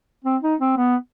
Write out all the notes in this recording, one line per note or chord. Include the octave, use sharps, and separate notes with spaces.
C4
D#4
C4
B3